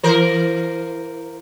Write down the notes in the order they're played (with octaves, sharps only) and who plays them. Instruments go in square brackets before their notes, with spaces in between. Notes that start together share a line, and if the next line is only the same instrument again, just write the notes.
[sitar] E3 A#4 C5